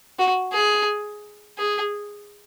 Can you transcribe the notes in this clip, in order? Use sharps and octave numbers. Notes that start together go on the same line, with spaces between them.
F#4
G#4
G#4